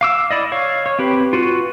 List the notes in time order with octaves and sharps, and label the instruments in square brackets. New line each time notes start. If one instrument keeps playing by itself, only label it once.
[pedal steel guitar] F5 D6 E6
E4 D5 D#5
C#5 F5
C#5
C4 G4 B4
F4 F#4 B4